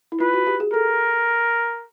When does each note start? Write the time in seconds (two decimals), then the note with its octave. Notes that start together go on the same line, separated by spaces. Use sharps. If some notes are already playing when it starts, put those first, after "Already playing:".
0.12 E4
0.20 F4 B4
0.34 F#4
0.47 G4
0.60 G#4
0.73 A4 A#4